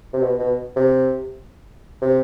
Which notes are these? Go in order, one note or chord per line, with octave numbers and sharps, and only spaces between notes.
C3
B2
B2
C3
C3